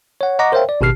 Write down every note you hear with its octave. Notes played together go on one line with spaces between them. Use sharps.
C#5 F#5
D#5 F#5 A#5 C#6 D6 A#6
A#4 C5 C#5 E5 F5 G5
D5
G#1 B2 G4 F6 C7